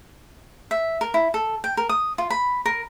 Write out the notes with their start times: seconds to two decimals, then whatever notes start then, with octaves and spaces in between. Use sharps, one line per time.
0.71 E5
1.01 A#4
1.14 E4
1.34 A4
1.64 G5
1.77 A#4
1.89 D#6
2.18 F4
2.30 B5
2.66 A#4